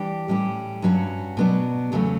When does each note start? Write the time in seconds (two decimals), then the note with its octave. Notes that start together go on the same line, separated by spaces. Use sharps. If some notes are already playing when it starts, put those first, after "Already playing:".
Already playing: E3 G3 D4 G4
0.28 A2 G3 C#4 G4
0.82 G2 F#3 C#4 F#4
1.37 B2 F#3 B3 D4
1.92 E2 C#3 F#3 A3 C#4